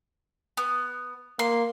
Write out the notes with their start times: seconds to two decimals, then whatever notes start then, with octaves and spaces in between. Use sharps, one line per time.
0.57 B3
1.39 A#3 C6